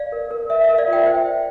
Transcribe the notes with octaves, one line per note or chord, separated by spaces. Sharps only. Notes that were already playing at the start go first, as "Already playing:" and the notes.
Already playing: D5 F5
A#4
A#4
A#4 E5
E5
A#4
D5 F5
F4 E5 G5
C5 E5 G5
C5